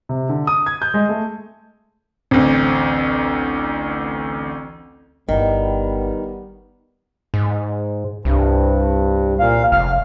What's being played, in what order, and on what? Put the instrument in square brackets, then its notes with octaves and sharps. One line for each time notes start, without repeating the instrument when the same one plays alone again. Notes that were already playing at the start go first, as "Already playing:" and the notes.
[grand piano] C3
D3
D#6
G#6
G6
G#3
A3
[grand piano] A1 D2 [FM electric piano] C4
[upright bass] G1 E4 [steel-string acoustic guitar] D#3 [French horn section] G3 B3
[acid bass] G#2
[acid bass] C2 [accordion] G2
[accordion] A#2 F5
[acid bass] F1 [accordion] F5 F6